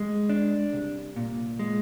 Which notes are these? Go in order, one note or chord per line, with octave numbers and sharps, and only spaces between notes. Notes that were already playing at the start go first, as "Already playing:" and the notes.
Already playing: G#3
D4
C2
A#2
G#3